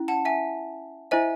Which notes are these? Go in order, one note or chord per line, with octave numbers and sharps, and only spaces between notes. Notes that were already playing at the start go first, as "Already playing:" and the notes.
Already playing: C#4 E4
F#5 A5
E5 G#5
E4 C5 D#5 E5 G#5